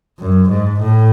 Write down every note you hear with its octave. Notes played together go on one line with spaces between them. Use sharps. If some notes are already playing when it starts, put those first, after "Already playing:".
F#2
G#2
A2